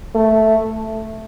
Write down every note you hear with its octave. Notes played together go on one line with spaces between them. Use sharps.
A3